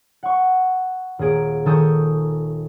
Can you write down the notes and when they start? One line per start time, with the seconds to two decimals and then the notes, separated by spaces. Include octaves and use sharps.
0.23 F#5 C#6
1.19 D#1 A#3 G#4 D7
1.66 D#3 A4 G#5 C#6 D#6 G6